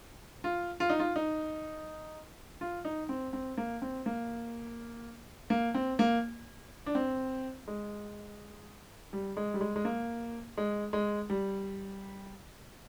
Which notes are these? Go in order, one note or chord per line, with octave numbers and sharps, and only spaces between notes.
F4
F4
D#4
F4
D#4
F4
D#4
C4
C4
A#3
C4
A#3
A#3
C4
A#3
D4
C4
G#3
G3
G#3
G3
G#3
G#3
A#3
G#3
G#3
G3